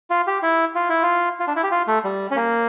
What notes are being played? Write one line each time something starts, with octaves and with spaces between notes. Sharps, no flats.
F4
G4
E4
F4
E4
F4
F4
D4
E4
G4
F4
A3
G3
C#4
A#3